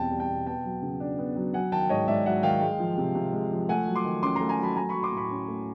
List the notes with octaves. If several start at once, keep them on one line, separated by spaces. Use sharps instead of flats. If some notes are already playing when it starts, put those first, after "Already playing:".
Already playing: E2 B2 G3 C4 G5 A5
G3
G5 A5
B2
B3 G5 A5
F#3
C#3
D4
B3
F#3
F#3 F#5 G#5
D#3 G5 A5
G#2 C#5 D#5
G#2 D5 E5
F#3 E5 F#5
D#3 F5 G5
G#3
F3
C3
C3
G#3
F3
A3 F#5 G#5
F#3
C6 D6
D#3
C#4 C6 D6
A3 A#5 C6
G#5 A#5
F#3 A5 B5
A3 G#5 A#5
F#3 B5 C#6
C6 D6
A2
B5 C#6
C#4
A3